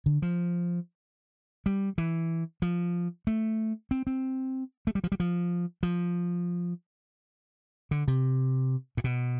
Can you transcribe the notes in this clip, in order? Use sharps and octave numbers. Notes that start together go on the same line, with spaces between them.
D3
F3
G3
E3
F3
A3
C4
C4
A3
G3
F3
G3
F3
F3
D3
C3
A2
B2